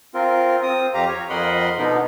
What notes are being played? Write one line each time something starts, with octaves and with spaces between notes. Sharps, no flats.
C4 F4 A#4
C4 D#6
F2 G4 F5 A#5
C#5
F2 A#4 D#5 F#5 B5 C6
B2 D3 B3 D#4